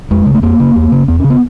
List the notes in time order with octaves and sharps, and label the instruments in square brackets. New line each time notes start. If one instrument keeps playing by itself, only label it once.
[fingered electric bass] F2 G#3
C#3
A3
F2 A#3
C#3
E2
C#3
E2 B3
C#3 C#4
B3